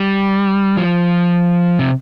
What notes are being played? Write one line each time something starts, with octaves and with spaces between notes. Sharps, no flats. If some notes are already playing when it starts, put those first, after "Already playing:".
Already playing: G3
F3
C3